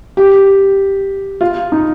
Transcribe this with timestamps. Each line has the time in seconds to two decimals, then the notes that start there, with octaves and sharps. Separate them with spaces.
0.17 G4
1.41 F4
1.72 D#4